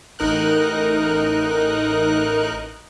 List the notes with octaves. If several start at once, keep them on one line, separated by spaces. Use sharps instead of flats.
A1 D#4 A#4 F#6